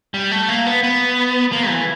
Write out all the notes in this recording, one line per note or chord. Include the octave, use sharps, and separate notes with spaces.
G3
A3
A#3
B3
B3
A#3
E3